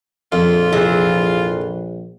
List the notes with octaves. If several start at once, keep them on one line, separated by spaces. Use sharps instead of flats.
A#1 F2 F4
C3 E3 G#4